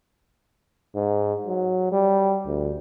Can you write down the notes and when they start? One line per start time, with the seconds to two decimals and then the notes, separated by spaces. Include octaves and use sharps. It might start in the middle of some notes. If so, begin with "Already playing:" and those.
0.94 G#2
1.47 F#3
1.92 G3
2.46 D2